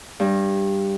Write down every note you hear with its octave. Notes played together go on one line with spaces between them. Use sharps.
G2